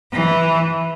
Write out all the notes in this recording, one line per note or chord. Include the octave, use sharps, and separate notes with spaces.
E3